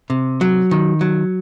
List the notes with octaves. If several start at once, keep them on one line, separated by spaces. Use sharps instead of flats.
C3
F#3
D#3
F#3